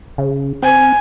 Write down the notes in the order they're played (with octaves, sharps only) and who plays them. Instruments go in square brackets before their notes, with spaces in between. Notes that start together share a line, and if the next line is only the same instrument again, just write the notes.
[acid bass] C#3
[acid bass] C4 [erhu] G#5